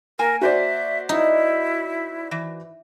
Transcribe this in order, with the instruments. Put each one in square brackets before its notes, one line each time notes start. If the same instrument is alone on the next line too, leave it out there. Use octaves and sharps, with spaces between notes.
[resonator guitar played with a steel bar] A#3 G#5 [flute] A#4
[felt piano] F#4 C5 D5 [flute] E5
[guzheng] D#4 [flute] E4
[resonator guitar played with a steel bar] E3